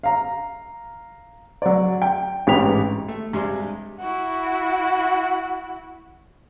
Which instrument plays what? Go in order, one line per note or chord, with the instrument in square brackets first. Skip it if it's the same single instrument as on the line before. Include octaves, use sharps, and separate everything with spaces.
[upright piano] F5 A#5
F#3 D5
G5
A1 G#2 G4 B4 B6 F7
[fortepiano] A3
G2 C3 G3 G#3
[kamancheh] E4 F#4